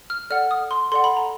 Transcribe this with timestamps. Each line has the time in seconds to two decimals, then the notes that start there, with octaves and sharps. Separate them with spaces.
0.10 F6
0.30 A4 D5 F#5 F6
0.51 D#6
0.71 C6
0.92 A4 D5 F#5 C6
1.04 B5
1.17 A#5